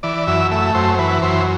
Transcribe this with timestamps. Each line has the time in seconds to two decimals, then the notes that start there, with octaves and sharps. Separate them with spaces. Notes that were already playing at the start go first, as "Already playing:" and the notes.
0.03 E3 D5
0.27 F#2 E5
0.51 A3 E5
0.75 F#2 C5
0.94 C5
0.99 E3 B4
1.22 F#2 C5